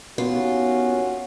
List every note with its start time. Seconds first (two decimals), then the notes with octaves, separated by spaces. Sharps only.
0.18 D#2 B3 C#4 F4 F#4